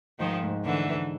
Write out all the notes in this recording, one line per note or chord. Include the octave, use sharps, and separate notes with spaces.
G#2 D#3 F3
G#2
G#2 D3 E3
G#2